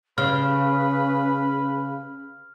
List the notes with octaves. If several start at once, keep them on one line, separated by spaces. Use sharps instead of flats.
C#3 C#4 B4 F6